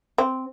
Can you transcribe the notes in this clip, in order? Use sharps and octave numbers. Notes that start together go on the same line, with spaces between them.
C4